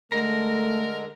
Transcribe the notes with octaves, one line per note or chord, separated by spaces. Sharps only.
D3 G#3 A3 A#4 A#5